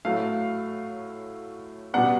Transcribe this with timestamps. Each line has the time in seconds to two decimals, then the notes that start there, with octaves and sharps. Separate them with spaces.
0.05 A2 F#3 A3 F5
1.94 B2 G3 B3 D4 F#5